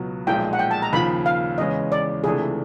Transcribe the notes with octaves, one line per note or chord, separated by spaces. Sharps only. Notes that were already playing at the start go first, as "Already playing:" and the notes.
Already playing: C#2 B2 F#3 B3
B1 A#2 F3 G#3 G5
F#5
G5
A5
A#5
D#2 C#3 F3 B5
F5
E2 C#3 E3 G#3 C#4 D#5
D5
C#2 C3 E3 A3 D4 G#4